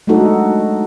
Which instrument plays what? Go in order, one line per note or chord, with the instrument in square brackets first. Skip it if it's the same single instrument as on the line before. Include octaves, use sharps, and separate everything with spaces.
[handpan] G#3 A3 D4 D#4 F#4 A4